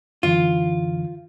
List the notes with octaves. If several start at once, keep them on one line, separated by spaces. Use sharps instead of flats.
F#2 D3 E3 F4